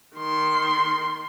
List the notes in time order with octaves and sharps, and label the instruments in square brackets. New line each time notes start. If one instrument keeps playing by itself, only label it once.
[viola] D#3 C6